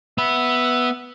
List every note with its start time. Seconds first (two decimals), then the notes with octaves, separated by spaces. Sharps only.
0.18 B3 E5 B5